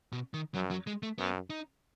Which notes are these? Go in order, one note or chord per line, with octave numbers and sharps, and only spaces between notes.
B2
D#3
F#2 F#3
F#3
G#3
A3
F#2 B3
D#4